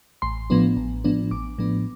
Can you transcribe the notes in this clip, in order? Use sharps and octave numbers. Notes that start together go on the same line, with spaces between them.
A1 C6
A2 F3 B3 D4
A1
A2 F3 B3 D4
A1 D6
A2 F3 B3 D4